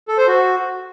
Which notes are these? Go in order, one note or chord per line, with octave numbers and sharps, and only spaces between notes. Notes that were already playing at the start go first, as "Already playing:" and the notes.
A4
C5
F#4